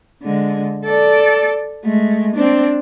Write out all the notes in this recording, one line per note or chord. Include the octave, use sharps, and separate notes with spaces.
D3 G#3
A4 D5
G#3 A3
C4 D4